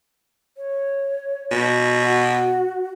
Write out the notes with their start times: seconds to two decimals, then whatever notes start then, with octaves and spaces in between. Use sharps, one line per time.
0.57 C#5
1.51 B2
2.02 F#4